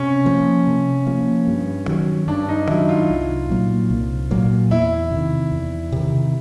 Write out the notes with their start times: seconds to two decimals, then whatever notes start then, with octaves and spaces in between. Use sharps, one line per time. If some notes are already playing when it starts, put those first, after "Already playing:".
Already playing: C3 C#4
0.26 F3 A#3
0.67 C3
1.07 F3 A#3
1.47 G2
1.88 D#3 F#3
2.28 G2 D4
2.49 D#4
2.68 D#3 F#3 E4
2.89 F4
3.09 C2
3.49 A#2 F#3 A#3
3.90 C2
4.31 A#2 F#3 A#3
4.71 E2 E4
5.11 C3
5.16 D#3
5.52 E2
5.92 C3 D#3